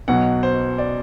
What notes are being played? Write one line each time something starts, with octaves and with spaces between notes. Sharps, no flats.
B1 B2 F#3 F#5
C5
D5